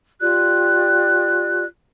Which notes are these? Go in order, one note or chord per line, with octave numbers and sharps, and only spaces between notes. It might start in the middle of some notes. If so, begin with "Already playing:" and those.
F4 G4 D5 F#6